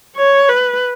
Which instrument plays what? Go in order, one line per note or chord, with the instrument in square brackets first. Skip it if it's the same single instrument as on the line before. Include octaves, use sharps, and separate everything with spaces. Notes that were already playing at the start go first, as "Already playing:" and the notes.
[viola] C#5
B4